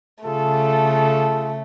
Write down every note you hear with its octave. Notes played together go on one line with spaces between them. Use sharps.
C#3 A3 F4 G#4 A4